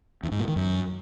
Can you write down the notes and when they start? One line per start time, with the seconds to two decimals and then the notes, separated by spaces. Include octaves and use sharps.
0.23 E2
0.32 G#2
0.40 A#2
0.48 D#3
0.56 F#2